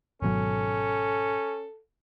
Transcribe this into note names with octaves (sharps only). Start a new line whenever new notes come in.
G#1 B2 F#3 C#4 A4